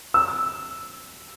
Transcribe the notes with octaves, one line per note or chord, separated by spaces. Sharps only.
E6